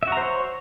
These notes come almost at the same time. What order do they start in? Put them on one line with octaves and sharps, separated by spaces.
E5 F#4 A#5 C5 C#5